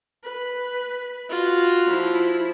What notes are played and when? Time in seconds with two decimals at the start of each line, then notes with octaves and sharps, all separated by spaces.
0.24 B4
1.30 F4 F#4
1.86 F3 E4